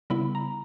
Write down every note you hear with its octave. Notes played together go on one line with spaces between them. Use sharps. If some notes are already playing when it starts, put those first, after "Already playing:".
C#3 G3 B3 E4 B5
A#5